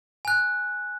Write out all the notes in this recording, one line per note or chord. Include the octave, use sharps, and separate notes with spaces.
G#5 F#6